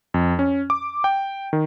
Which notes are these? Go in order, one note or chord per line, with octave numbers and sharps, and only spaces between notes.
F2
C#4
D6
G5
D#3